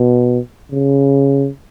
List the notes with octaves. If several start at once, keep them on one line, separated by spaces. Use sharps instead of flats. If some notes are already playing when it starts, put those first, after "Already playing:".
Already playing: B2
C#3